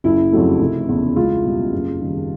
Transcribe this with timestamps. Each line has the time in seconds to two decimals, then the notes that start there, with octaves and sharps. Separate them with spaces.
0.04 F#1 E4
0.32 F2 C#3 F#3 A3
0.60 F1
0.89 E2 C#3
1.16 C#2 F4
1.44 B2 G3
1.72 F#1
2.00 F#2 D#3 G3